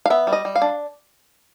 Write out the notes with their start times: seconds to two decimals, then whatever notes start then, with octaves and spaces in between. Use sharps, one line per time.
0.06 F5
0.10 B3 E5
0.27 G3
0.33 D#5
0.45 G3
0.56 F5
0.62 D4